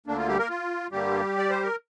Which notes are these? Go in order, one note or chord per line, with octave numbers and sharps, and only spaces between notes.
D2 D3 A#3 D4
F4
G3 G4
A#3 A#4
F4
G2 D3 G3 A#3 G4
D5
C5
A#4